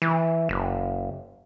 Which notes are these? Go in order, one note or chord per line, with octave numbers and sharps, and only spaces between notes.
E3
F#1